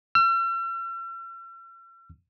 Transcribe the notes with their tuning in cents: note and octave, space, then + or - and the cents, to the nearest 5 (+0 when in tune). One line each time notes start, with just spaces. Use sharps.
E6 +45